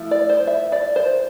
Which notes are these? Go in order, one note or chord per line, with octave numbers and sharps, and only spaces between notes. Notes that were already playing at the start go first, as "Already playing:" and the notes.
Already playing: F3 A3 E4
D5
C5
E5
D5
C5